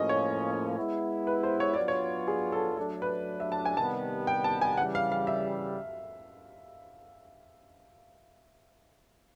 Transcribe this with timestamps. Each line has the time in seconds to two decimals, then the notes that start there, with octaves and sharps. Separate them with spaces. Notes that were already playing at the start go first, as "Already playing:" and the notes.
Already playing: A2 F3 A#3 C#4 D#5
0.09 C#5
0.77 G#3 B3 E4
1.27 B4
1.43 C5
1.60 C#5
1.74 F#3 B3 D4 F4 D5
1.88 C#5
2.28 G#4
2.52 A4
2.77 F#3 A3 D4 A4
3.02 B4
3.40 E5
3.52 A5
3.65 G#5
3.77 C3 D#3 G3 B3 A5
4.27 G5
4.44 A5
4.61 G#5
4.78 C#3 E3 G3 F#5
4.95 F5
5.12 F5
5.27 E5